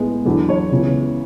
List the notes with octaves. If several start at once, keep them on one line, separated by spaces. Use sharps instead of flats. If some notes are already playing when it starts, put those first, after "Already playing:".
Already playing: A2 G#3 B3
E2 D3 F#3
C#5
C#2 C#3 E3 B3